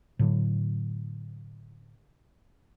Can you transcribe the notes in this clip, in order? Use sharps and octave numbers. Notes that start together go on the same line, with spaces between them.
A2 D3 F#3